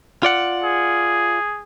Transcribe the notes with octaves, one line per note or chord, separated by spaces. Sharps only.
F4 D5 F#5
G#4